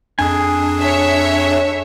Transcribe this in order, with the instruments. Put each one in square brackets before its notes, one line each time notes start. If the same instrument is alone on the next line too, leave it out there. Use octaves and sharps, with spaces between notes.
[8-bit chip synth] F2 D4 [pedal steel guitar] G#4 G#5
[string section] C#5 E5